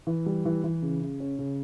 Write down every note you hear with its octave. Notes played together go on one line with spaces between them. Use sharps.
E3
G3
E3
E3
C#3
C#3
C#4
C#3